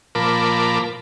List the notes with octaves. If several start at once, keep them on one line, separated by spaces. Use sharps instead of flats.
A#2 F3 A#4 A5 B5 D6